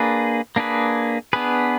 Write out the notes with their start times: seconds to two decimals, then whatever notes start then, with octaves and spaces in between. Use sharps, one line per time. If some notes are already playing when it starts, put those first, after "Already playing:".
Already playing: A#3 D4 G#4 B4
0.56 A#3 D4 G#4 B4
1.33 B3 D4 G#4 B4